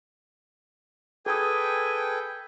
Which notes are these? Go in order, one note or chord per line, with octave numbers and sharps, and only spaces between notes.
G#4 A4 B4 G5 G#5 D#6